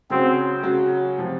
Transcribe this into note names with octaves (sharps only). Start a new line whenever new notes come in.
C#3 F#3 C4 C#4 F#4
C#3 F#3 C#4 F#4
C3 F3